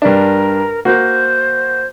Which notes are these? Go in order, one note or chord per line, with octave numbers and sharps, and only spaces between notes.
G2 D4 A#4
A#3 F#4 C5